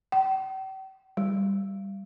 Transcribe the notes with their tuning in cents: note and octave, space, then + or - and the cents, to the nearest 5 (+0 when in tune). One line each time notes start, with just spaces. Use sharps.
G5 -40
G3 +5